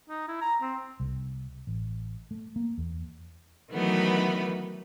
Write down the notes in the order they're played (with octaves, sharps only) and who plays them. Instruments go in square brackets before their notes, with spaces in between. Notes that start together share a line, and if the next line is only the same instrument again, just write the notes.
[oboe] D#4
E4
A#5
C4
[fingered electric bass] C2
A1
A3
A#3
E2
[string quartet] D#3 E3 F#3 A3 B3 B4